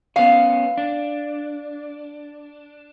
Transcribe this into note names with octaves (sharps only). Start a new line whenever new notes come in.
B3 C#4 F5
D4